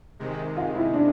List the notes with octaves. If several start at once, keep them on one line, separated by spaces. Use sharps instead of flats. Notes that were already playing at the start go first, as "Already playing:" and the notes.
C3 D#3 G#3
F4
E4
D4